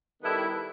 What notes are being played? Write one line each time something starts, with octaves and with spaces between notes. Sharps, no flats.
D#3 G3 B3 E4 A4